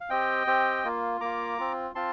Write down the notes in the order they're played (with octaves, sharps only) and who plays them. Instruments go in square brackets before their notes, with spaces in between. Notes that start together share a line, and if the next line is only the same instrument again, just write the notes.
[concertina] F5
C4 G4 D#5 G5
C4 G4
A#3 F4
A#3 F4 A#5 D6
C4 F4
C4 F4 A5 C6